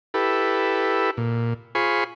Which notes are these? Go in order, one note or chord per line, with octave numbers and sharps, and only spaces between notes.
E4 G4 A4 B4
A#2
F4 G#4 C5 G#5 B5 C#6